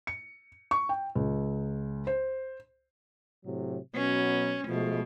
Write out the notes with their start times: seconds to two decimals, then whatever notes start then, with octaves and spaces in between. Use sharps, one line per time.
0.07 C#7
0.71 C#6
0.89 G5
1.15 C#2
2.07 C5
3.45 A2 C3 F#3
3.95 B2 F#3 B3 C#4
4.68 B2 F3 G#3 A3